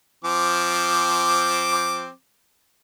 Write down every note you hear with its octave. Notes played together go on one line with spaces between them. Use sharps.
F3 C4 D6